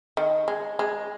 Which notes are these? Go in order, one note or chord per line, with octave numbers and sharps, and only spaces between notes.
D#3
G#3
G#3